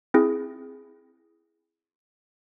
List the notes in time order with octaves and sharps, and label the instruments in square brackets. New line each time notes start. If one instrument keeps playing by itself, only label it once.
[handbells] C4 E4 G#4